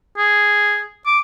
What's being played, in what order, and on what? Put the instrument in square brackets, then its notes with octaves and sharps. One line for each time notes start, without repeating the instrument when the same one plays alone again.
[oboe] G#4
D6